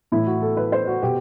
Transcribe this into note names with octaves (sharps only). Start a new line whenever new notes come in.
A2 E3 E4
F#4
A4
B4
C5
F#4
B2 G4